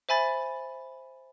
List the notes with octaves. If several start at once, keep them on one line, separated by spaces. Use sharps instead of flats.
C5 E5 G#5 B5 A6